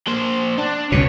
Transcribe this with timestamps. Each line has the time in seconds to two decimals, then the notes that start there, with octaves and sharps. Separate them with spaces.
0.07 A#3 C5
0.58 D4
0.92 C#2 B2 C#5